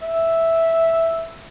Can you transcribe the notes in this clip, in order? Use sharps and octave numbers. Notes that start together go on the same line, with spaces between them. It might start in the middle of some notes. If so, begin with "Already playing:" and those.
E5